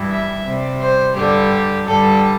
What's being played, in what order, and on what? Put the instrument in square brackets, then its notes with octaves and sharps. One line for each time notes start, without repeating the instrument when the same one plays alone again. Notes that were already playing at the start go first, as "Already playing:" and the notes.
Already playing: [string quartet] G2 E3 G3
E5
C3 G3
C5
G2 D3 G3 G4
G2 D3 G3 A4